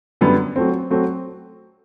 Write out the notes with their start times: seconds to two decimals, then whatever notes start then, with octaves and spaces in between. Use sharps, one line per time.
0.21 F#2 D3 G3 B3
0.56 F#3 A3 C4
0.91 F#3 A3 C4